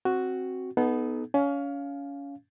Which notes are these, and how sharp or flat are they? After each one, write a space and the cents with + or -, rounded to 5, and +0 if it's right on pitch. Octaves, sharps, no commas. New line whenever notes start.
C4 +10 F#4 +0
B3 +0 D#4 +0 A4 -40
C#4 +25 F5 +0